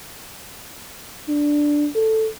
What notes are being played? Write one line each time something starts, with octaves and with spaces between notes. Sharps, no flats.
D4
A4